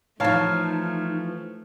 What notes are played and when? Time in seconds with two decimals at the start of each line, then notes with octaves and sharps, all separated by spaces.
0.20 E3 F3 A3 D#4 C#5 F5 A5